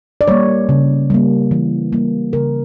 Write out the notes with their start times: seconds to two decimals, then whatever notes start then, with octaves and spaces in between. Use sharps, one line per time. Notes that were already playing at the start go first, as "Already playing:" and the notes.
0.21 D5
0.28 G3 A#3 C#5
0.69 C#3
1.10 G3 A#3
1.51 E3
1.93 G3 A#3
2.33 C#3 A#4